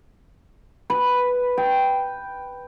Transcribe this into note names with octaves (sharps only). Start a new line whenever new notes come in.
B4
G5